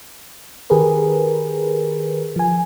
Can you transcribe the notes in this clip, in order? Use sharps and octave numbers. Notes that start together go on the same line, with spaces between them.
D#3 G4 G#4 A#4 B4
F3 G#5